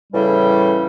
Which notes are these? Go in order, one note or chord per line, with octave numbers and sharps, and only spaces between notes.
A2 C#3 E3 G3